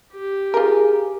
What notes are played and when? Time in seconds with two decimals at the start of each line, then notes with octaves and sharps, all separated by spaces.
0.13 G4
0.54 F4 G#4 A#4